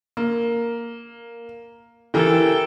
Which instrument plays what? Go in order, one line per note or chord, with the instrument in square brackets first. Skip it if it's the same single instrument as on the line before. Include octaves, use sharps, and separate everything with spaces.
[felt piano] A#3
[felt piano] E3 G4 A#4 [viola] A4 G5